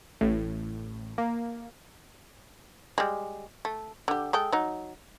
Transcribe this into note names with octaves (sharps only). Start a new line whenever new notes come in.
A1 A2
A#3
G3 G#3
A3
D3 G4
G#3 A4 G5
F#3 D#4